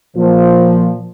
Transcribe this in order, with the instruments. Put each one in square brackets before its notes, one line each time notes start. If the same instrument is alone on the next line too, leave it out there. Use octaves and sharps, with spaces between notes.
[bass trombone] A#2 [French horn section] F3